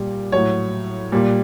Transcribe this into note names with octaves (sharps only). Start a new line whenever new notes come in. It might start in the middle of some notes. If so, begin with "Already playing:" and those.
Already playing: A#2 G3
A2 F#3 C#5
A#2 G3